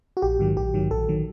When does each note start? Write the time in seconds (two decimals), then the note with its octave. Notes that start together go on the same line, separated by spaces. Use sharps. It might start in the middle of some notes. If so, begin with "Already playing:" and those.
0.17 F#4
0.22 A#1 G4
0.39 G#2 D#3 F#3
0.56 A#1 G4
0.74 G#2 D#3 F#3
0.91 A#1 A4
1.09 D#3 F#3